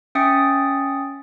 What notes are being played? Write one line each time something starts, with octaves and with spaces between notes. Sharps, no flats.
C#4 E5 G5 D#6 A6 C#7